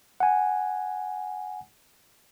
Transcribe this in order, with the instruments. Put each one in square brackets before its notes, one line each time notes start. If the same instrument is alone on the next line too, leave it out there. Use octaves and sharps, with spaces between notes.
[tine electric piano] F#5 G#5